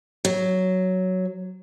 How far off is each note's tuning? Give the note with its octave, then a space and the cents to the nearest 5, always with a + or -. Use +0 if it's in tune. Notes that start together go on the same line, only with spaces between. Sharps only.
F#3 +5